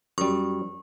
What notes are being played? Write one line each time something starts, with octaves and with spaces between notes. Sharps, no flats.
F#2 G3 C#6